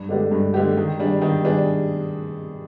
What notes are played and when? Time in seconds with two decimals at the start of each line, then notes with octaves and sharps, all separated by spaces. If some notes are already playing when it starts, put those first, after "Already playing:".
Already playing: G2
0.09 D3 G#3 D4 G4
0.31 G2
0.54 D3 G#3 D4 G4
0.77 D#3
0.99 G3 D4 G#4
1.22 D#3
1.44 G3 D4 G#4